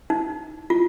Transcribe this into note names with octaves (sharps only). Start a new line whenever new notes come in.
D#4
F4